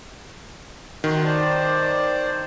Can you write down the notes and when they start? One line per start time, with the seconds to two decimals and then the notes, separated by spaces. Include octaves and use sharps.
1.04 C3 D#3 F#4 C6
1.25 C5 D5 A5